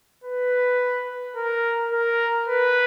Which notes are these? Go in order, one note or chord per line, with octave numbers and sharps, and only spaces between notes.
B4
A#4
A#4
B4